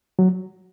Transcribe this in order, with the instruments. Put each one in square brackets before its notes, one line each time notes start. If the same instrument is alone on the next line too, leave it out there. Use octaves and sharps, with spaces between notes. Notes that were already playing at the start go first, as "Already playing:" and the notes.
[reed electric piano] F#3